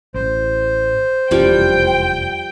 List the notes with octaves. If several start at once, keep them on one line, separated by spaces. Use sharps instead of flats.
A1 C5
F1 E2 F3 G3 C#4 F4 G5